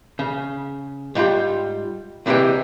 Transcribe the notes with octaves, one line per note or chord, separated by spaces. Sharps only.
C#3
G#2 G3 F4 G5
D2 C3 E3 G#3 C5 G5